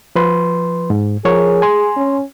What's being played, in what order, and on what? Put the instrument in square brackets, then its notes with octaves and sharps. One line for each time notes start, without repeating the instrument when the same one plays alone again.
[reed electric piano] F3 B4 C6
G#2
[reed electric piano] F3 A#4 C#5 [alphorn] G#4
[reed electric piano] G#5 C6
[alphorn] C#4